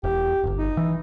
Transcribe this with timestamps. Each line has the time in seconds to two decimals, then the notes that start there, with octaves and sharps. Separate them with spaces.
0.04 E1 G4
0.44 D1 G1
0.58 D#4
0.77 E3